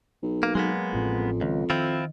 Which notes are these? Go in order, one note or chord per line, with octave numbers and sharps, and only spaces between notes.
B1
A#3
F#3 G#3 A#3 B3
A1 F2 A2 C#4
C#2 D#3
D#3 C4 E4 F4